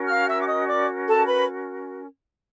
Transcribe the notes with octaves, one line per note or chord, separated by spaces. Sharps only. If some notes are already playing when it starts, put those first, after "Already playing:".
Already playing: C#4 F#4 A#4
F5 F6
E5 E6
D6
D#5 D#6
D5 D6
A4 A5
B4 B5